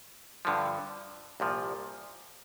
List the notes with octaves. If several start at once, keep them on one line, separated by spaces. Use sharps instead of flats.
G2 D3 F3
C2 A#2 F3